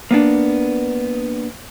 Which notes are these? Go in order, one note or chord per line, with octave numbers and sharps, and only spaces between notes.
A#3 B3 D4